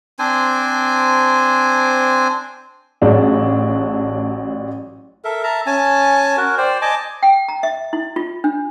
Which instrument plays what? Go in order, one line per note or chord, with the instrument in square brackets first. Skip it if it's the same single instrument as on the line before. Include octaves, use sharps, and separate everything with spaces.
[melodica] C4 D4 C5 G#5
[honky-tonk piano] A1 F#3 G#3 D4 F4
[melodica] A4 A#4 E5
E5 A5 A#5
C#4 G#5 A5
F#4 A#4
C5 D5 G5
D#5 G#5 A5 D6
[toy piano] G5
A#5
E5
E4
F4
D4